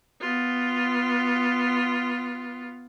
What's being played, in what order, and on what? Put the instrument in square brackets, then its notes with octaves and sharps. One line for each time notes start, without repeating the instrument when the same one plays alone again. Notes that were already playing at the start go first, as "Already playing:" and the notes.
[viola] B3 F4